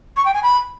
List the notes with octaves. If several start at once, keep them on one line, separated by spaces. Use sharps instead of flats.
C#6
G5
G#5
B5